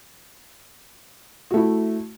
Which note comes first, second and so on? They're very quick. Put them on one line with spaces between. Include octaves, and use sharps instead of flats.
F#4 A3 E4